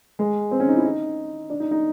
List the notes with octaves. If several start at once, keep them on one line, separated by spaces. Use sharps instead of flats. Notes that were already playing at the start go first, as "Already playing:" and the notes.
G#3
C4
C#4
D#4
E4
D#4
D4
D#4
D#4